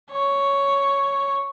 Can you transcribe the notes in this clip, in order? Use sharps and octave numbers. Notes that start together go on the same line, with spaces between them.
C#5